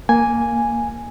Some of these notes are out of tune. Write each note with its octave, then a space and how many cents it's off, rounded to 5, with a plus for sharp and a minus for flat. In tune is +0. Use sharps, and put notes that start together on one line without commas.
A#3 +0 G#5 +0